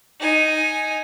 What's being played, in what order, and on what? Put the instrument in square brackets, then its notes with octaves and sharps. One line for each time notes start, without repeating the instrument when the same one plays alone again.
[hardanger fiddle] D#4 G#5